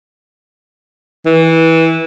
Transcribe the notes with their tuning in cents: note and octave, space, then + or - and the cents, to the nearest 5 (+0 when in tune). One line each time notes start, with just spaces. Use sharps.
E3 -15